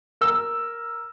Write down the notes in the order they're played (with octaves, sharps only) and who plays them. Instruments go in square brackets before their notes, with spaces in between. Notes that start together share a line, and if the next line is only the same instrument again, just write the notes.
[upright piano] A#4 E6